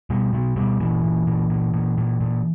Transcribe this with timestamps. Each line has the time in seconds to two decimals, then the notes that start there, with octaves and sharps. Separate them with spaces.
0.10 B2 G3
0.33 B2 F#3
0.56 B2 G3
0.80 A#2 E3
1.04 A#2
1.27 A#2
1.50 A#2
1.74 A#2
1.98 A#2
2.21 A#2